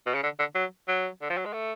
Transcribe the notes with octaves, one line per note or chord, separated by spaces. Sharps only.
B2
C#3
D3
D3
F#3
F#3
D3
F3
F#3
G#3
A3